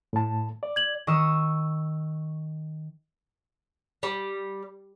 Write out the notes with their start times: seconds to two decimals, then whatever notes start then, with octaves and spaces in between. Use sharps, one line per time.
0.13 A2 A5
0.63 D5
0.76 G#6 F#7
1.07 D#3 C#6 D#6 E6 E7
4.03 G3